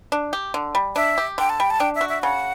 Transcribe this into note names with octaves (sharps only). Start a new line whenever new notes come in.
D4
G4
D3
G3
D4 E5
G4
D3 G5
A5
G3 G5
A5
D4 G5
E5
F#4
E5
C#3 F#5